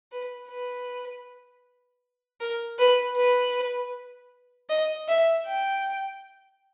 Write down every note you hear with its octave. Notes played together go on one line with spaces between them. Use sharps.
B4
B4
A#4
B4
B4
D#5
E5
G5